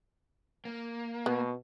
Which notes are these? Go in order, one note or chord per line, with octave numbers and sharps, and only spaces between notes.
A#3
B2 B3